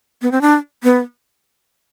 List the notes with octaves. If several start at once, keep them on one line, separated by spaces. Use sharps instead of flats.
B3
C4
D4
B3